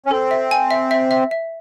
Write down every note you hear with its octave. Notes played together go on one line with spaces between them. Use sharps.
C#4
C4 A4
E5
G#5
E5
E5
E5
E5